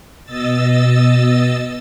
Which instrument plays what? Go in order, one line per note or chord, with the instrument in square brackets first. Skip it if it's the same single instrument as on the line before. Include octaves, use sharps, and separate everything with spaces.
[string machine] B2 D#5 E6 A6